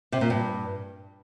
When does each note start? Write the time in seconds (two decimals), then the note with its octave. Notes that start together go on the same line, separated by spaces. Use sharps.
0.12 C3
0.21 A#2
0.30 G2